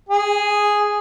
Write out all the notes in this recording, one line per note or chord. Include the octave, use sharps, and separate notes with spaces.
G#4